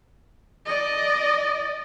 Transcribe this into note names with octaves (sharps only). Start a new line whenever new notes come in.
D5 D#5